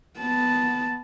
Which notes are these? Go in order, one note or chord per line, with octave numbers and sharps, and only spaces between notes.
B3 A5